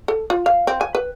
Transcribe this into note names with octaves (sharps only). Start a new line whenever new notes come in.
A4
F4
F5
C4
G#5
B4